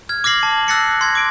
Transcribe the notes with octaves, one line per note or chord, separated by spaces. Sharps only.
F6 G#6
D6 F6 A#6 C7 F#7
A5
E6 F#6 A6 A#6 C7 C#7
C6 G#6 A#6
D6 D7